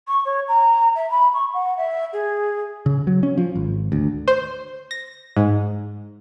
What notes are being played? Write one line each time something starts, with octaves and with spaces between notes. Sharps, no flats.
C#6
C#5
A#5
E5
B5
C#6
F#5
E5
G#4
C#3
F#3
C#4
F3
G#1
D2
C5
A#6
G#2